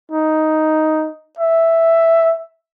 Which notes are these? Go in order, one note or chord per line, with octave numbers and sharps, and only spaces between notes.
D#4
E5